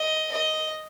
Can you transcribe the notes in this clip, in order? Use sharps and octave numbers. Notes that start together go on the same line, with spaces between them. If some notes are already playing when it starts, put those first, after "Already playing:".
Already playing: D#5
D#5